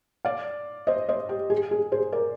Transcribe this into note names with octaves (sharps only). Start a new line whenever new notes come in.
D5 F5
C5 D#5
C5 D#5
G4
G#4
G#4
G#4 C5
A#4 D5